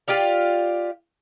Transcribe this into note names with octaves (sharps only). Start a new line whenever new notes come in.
F4 G4 D5 F5